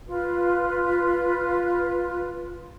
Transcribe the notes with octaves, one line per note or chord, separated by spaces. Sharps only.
F4 B4